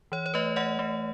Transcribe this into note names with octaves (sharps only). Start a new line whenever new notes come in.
E3 C#5
C#5
A3 B4 D#5
A3 D#5 F#5
A3